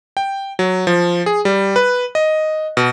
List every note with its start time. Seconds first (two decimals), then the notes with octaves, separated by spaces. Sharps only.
0.17 G5
0.59 F#3
0.87 F3
1.26 G#4
1.45 G3
1.76 B4
2.15 D#5
2.77 B2